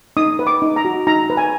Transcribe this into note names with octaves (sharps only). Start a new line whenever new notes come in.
D#4 D#6
B4
D6
D#4
A#5
F#4
D#4 A#5
B4
G#5